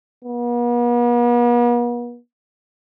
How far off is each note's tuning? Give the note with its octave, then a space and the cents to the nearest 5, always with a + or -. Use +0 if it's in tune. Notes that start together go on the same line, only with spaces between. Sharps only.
B3 -45